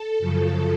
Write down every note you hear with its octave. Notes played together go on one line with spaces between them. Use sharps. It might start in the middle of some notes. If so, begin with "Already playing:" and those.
Already playing: A4
F#2 C#3 F3